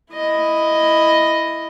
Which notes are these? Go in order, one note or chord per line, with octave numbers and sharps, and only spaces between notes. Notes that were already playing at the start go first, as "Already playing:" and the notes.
E4 D#5